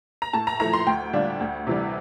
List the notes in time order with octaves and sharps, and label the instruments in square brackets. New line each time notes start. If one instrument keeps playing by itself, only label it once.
[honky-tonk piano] A#5
A2 A5
A#5
F3 A3 E4 A#5
C6
D2 G5
D3 G3 D4 F4
D2
C3 E3 G3